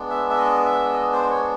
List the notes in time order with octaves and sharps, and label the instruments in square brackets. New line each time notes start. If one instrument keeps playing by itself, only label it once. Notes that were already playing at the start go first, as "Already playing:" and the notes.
Already playing: [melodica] G#3 B3 D4
E5
E5
D#5
E5
D#5
C5
C#5